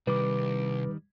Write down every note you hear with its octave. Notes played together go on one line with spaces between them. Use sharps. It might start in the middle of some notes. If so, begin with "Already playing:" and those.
C2 D#3 G3 B4 D6